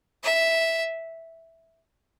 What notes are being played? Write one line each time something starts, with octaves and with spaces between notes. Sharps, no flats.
E5